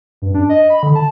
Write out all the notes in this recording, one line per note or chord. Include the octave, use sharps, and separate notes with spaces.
G2
D4
D#5
B5
D3
A5